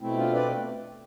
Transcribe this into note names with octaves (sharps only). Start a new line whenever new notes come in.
B2 A3 C4 E4
D4 F4
B4 D5